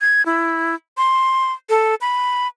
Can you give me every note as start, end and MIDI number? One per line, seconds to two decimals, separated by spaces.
0.01 0.25 92
0.26 0.75 64
0.97 1.53 84
1.69 1.95 69
2.01 2.47 83